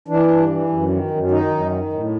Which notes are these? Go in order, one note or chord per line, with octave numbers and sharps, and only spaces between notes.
E3 D4
G2
E3
F#2
D#3
F#2
D#3 D#4
F#2
D#3
A2